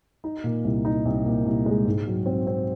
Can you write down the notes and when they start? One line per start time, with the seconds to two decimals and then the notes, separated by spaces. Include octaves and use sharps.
0.24 D#4
0.44 A#2
0.65 C2
0.85 D#4
1.05 C2
1.26 A#2
1.46 C2
1.66 G#3
1.85 G#2
2.07 F#3
2.26 C4
2.47 C4